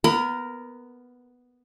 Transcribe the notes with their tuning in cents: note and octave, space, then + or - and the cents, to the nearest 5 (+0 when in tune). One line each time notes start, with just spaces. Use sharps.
B3 +0 A#4 +0 B5 +35